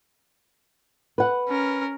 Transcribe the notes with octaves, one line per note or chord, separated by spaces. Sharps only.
B4 F#5
C#4 A#4